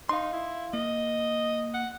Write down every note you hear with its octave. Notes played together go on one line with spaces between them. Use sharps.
D#4 F5 C6
E4
A#3 D#5
F#5